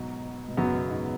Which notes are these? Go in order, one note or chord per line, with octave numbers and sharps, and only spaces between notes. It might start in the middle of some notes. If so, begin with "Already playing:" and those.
Already playing: G#2 B2 F#3
B2
F#2 C#3 F#3 B3
B2
G#2